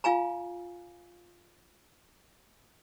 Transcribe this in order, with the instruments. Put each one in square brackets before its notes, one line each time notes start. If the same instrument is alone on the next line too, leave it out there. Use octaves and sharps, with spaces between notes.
[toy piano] F4 F5 G#5 A#5